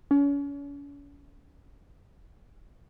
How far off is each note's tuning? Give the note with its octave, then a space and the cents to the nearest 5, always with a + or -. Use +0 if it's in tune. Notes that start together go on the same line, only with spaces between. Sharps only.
C#4 +35